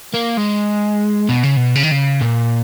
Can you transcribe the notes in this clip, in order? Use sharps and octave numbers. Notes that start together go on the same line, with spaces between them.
A#3
G#3
B2
C#3
B2
C#3
D#3
C#3
A#2